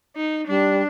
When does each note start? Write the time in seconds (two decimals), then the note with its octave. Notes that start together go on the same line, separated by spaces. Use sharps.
0.17 D#4
0.47 G3 D4